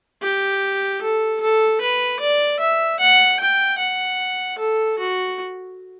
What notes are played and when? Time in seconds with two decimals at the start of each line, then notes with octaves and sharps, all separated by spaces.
0.22 G4
1.01 A4
1.41 A4
1.81 B4
2.20 D5
2.60 E5
3.00 F#5
3.40 G5
3.79 F#5
4.58 A4
4.99 F#4